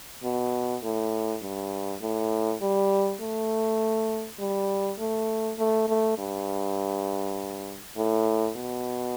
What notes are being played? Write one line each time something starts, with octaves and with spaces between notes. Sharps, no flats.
B2
A2
G2
A2
G3
A3
G3
A3
A3
A3
G2
A2
B2